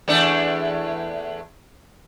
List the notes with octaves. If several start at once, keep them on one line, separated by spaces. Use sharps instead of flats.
E2 A3 D4